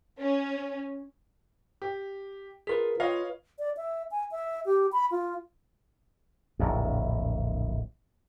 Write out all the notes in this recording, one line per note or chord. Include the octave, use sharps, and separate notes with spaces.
C#4
G4
F4 G#4 A#4 B4 B6
F4 B4 C#5 D#5 F5
D5
E5
G#5
E5
G4
B5
F4
D1 A#1 F2